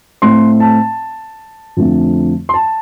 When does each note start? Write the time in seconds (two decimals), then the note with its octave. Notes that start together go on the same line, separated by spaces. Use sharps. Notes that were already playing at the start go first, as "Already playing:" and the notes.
0.22 A2 A3 C4 C6
0.60 A5
1.77 F2 D3 F3 A3 C4
2.49 C6
2.54 A5